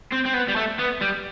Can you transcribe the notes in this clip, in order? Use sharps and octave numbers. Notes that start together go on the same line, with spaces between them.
C4
C4
B3
G3
A3
B3
G3